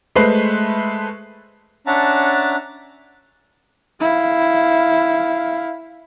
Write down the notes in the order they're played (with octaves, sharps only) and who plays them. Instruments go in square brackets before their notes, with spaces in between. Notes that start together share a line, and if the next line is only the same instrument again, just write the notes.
[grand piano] G#3 A3 B4 C5 C7
[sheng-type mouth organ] C#4 D4 E5 F#5 A5 A#5
[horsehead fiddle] E4 F5